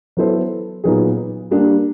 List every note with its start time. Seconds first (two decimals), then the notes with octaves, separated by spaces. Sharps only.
0.17 F#3 B3 E4 A4 C5
0.84 A#2 F#3 B3 D#4 G#4
1.51 G3 A#3 D4